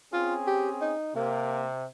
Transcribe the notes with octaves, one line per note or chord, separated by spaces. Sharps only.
C4 C#4 F4 G#4
G4
D#4
C3 A#3